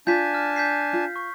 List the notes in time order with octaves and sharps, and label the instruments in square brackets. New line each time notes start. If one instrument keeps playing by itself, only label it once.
[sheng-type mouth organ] D4 G#5 A5 [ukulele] F4 [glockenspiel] G6 B6
[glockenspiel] F6
G6 B6 C7
[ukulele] F4
[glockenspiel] C#6